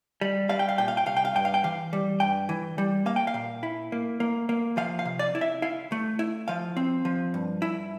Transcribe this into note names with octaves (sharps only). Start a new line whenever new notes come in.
G3
G3 F5
G5
F5
A#2 G5
F5
G5
C2 F5
G5
F5
G2 G5
F5
G5
E3 F5
G3
G2 G5
E3
G3
A#3 F5
G5
F5
A#2
E4
A#3
A#3
A#3
F3 F5
F5
C3
D5
E4
E5
E4 F5
A3
E4
F3 F5
C4
F3
G2
E4